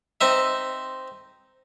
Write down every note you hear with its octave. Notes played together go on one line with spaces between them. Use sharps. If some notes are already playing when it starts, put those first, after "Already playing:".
C4 D#4 E5